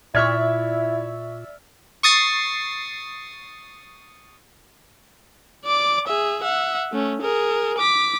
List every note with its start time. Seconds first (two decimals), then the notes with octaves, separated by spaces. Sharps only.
0.15 A#2 E4 D5 E5 C#6 E6 F6 G#6
2.03 C#6 D#6 A6 C7
5.65 D5 D6
6.07 G#4 E5
6.42 E5 F#5
6.92 A3 C#4
7.22 G#4 A#4
7.78 D6 B6